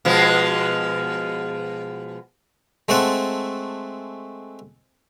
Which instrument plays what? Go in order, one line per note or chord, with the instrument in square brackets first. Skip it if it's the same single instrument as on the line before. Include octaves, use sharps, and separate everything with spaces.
[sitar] B2 F3 G#3
[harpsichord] G#3 A3 C4 F#5 A5